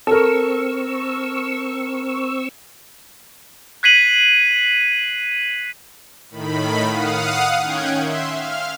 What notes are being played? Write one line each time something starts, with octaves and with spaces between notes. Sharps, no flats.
C4 A4 A#4 C#6 E6
F#6 G#6 B6 C7 D#7 F#7
A2 D#3 B5
F5 F#5 D#6
D#3 C#4 G5 F#6 G#6
E5 C6
F5 F6